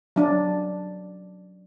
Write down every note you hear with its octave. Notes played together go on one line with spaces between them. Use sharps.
F#3 D4